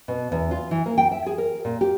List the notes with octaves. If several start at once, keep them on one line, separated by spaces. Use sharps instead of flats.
B2
E2
F4
E3
A#3
G5
E5
G#4
A#4
A#2
G4